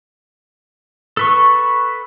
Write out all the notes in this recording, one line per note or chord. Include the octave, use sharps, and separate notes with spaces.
A4 B4 C#6